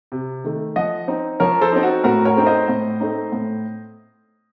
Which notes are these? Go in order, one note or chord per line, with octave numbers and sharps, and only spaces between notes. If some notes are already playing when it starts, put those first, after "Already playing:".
C3
D#3 A3
F3 D#5 F#5
C4 D#4
F3 A#4 C#5
A4 C5
C4 D#4
F#4
A2 F#4 A#4
A#4 C#5
A3 C4 D#4
C5 D#5
A2
A3 C4 D#4
A2